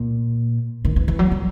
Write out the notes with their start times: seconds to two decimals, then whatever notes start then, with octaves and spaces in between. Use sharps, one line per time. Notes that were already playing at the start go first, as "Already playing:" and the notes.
Already playing: A#2
0.85 D#3
0.96 E3
1.08 E3
1.19 F#3
1.31 G3